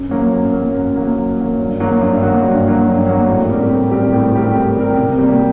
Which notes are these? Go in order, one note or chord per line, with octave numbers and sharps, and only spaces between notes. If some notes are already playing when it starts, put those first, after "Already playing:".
Already playing: F#2
F#3 A#3
F#2
F#3 A#3
F#2
F#3 A#3
F#2
F#3 A#3
G2
F#3 A#3 F#4
G2
F#3 A#3 F#4
G2
F#3 A#3 F#4
G2
F#3 A#3 F#4
A2
G3 C4 G4 A#4
A2
G3 C4 G4 A#4
A2
G3 C4 G4 A#4
A2
G3 C4 G4 A#4
C3
G3 A#3